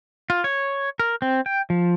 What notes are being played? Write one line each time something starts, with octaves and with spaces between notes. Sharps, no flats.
F4
C#5
A#4
C4
G5
F3